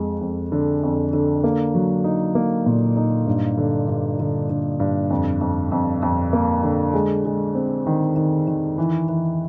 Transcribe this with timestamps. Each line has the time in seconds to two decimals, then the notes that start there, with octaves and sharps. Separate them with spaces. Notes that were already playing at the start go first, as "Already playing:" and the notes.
Already playing: F2 G#3
0.21 F2
0.52 D3
0.83 F2
1.13 D3
1.44 A#3
1.75 F#3
2.04 D#4
2.35 A#3
2.66 A#2
2.97 D#4
3.27 G2
3.57 D3
3.88 G2
4.20 D3
4.50 D3
4.80 G2
5.10 F2
5.41 F2
5.72 F2
6.02 F2
6.33 A#3
6.63 D3
6.94 G#3
7.25 G#3
7.55 C4
7.87 D#3
8.16 D#3
8.47 D#3
8.78 E3
9.09 E3